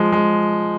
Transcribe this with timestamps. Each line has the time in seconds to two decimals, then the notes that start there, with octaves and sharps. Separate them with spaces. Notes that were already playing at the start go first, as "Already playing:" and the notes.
Already playing: F3 G#3
0.12 G#3